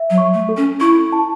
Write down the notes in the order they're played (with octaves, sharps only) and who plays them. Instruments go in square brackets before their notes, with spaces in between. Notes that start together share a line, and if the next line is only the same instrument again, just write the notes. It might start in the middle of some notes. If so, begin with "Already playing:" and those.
Already playing: [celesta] E5
[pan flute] F#3
[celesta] C#6
[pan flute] A3
[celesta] A4
[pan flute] C#4
[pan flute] E4 [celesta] C#6
[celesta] A5